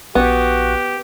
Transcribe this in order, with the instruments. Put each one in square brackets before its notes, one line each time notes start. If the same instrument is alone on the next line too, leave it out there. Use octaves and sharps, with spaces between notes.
[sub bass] A#1 [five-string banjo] B3 [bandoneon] F#4 [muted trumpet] G4